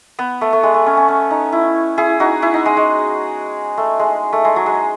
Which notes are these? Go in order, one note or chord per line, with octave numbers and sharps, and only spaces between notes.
B3
A3
A3
G#3
A3
C#4
C#4
C#4
D#4
E4
E4 G#4
D#4 F#4
E4
D#4
G#3
G#3
A3
G#3
A3
G#3
F#3
G#3